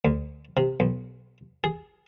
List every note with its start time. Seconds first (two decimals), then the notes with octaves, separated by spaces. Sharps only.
0.05 D2
0.57 C3
0.80 B1
1.64 G#4